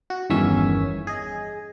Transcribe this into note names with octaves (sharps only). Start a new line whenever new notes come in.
F#4
G1 E2 D#3 C#4 E5 G#5
G#4 D#5